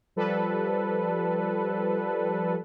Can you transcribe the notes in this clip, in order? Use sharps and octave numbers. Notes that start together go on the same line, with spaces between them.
F3 G3 A4 B4